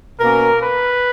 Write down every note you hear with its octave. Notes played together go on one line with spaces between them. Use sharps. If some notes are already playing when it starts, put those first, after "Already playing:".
B2 A#3 C#4 A#4
B4